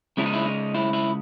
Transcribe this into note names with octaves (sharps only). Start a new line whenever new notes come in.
C#3 G#3 C#4 E4
D#4
E4
D#4
E4
E4